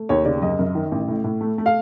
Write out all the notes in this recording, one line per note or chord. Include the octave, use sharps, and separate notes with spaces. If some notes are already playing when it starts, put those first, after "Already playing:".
Already playing: A3
D#2 C#5
C#3 D5
F#2 D#5
F#2
D#3
A1
A2
A2
A3
A3
F5